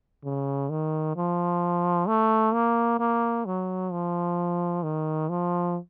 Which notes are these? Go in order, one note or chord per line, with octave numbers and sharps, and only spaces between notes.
C#3
D#3
F3
A3
A#3
A#3
F#3
F3
D#3
F3